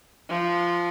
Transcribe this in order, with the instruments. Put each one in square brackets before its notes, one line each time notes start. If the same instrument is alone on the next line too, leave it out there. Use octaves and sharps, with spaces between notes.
[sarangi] F3